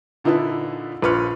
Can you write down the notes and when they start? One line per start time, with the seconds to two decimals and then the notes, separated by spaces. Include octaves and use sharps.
0.24 A#2 D3 D#4 E4 B4 A5
1.02 A#1 A#2 B4 C6 F6 C#7